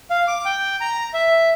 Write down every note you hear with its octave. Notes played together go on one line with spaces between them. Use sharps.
F5
D6
G5
A#5
E5